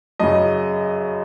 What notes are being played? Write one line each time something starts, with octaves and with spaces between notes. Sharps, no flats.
F#2 C#3 D#5